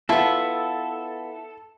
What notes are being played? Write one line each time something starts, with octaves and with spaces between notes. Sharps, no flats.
B3 E4 F4 A4 A5